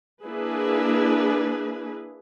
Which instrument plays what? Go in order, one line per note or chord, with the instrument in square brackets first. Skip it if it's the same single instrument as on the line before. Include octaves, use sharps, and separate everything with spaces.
[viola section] A#3 D4 E4 G#4 B4